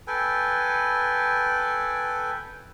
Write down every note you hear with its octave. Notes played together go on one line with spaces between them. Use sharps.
A4 B4 G5 G#5